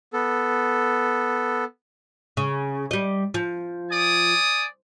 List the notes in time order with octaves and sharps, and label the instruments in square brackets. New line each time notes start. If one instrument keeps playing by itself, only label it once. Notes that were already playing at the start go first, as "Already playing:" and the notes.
[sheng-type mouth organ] B3 A4
[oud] C#3
G3 D#5
F3
[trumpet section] D5 G#5 D#6